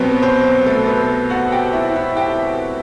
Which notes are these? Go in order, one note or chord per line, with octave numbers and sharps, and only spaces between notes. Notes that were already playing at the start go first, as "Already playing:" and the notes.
Already playing: C2 B2 F#3 B3 C4 B4
C4 C5
A3 A4
B3 B4
F#4 F#5
G4 G5
E4 E5
E4 E5
G4 G5